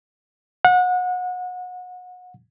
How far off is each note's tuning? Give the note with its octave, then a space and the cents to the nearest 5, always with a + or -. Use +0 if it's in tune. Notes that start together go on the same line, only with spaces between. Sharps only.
F#5 -30